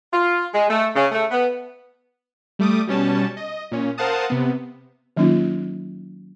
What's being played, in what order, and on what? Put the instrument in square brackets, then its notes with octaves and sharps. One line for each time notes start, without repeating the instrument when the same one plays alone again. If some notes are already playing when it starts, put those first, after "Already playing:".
[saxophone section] F4
G#3
A3
C#3
A3
B3
[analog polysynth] G3 A3 D6 D#6
B2 G3 C#4 A5
D#5
A#2 C#4
A#4 C5 F5 F#5 A5 D#6
C3 B3
[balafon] D#3 F#3 A#3 C#4 D#4 F4